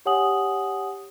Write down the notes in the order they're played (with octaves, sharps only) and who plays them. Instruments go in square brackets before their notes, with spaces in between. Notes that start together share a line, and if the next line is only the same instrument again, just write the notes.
[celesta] G4 C#5 F#5 G#5 D#6 F#7